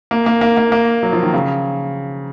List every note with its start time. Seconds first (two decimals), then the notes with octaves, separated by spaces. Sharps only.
0.11 A#3
0.26 A#3
0.41 A#3
0.57 A#3
0.72 A#3
1.03 F#3
1.13 F3
1.23 D#3
1.34 C#3